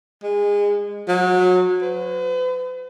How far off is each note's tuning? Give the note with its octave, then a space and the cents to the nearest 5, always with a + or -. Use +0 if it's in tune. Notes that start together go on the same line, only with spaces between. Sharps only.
G#3 -25
F#3 -25
B4 +45